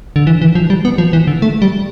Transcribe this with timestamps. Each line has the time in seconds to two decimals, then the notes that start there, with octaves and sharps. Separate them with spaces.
0.16 D3
0.27 E3
0.42 E3
0.55 F3
0.70 G3
0.85 B3
0.98 F3
1.13 E3
1.27 D3
1.42 A3
1.62 G3